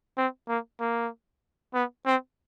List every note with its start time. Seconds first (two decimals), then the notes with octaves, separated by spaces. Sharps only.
0.17 C4
0.48 A#3
0.80 A#3
1.74 B3
2.06 C4